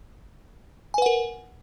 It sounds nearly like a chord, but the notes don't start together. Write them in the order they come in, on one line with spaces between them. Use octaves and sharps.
G#5 B4 F#5 A#4